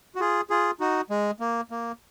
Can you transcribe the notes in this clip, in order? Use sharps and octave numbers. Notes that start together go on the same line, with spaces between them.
F#4
F4 G#4
F4 G#4
D#4 F#4
G#3
A#3
A#3